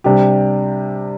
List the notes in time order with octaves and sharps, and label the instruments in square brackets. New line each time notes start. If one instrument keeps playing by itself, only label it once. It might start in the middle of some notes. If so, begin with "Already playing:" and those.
[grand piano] C3 G3 D4 G4